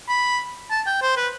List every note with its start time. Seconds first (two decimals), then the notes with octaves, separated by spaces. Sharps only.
0.08 B5
0.71 A5
0.87 G5
1.02 C5
1.17 B4